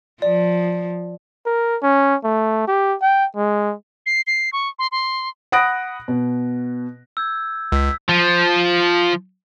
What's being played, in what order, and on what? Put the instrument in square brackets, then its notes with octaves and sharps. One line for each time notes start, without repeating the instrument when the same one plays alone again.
[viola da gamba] F3 [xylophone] D5
[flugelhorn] A#4
C#4
A3
G4
G5
G#3
[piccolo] C7
C7
C#6
C6
C6
[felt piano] F#5 B5 D#6 F#6 A#6 D7
B2
[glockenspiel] E6 G6 G#6
[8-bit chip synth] C#2 [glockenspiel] E6 B6
[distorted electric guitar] F3